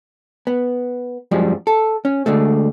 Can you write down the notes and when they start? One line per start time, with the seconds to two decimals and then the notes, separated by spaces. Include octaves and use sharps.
0.47 B3
1.31 F#2 F3 G3 G#3
1.67 A4
2.05 C#4
2.26 D2 D3 G#3 A3